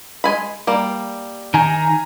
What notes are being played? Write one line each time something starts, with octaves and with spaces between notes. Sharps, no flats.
G#3 G#5 B5
G3 A#3
D#3 G#5 A#5